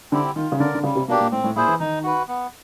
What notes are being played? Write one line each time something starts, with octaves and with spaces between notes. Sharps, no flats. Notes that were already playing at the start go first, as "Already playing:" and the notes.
D3 C4 E4 G4
D#3 F4
C#3
D3 A#4 D5
D3
C#3 G3
C3
B2 A#3 D4 G4
A#2
A2 C4
A2
A#2 E4 G#4 C5
E3
D#3 D#4
F#4 B4
B3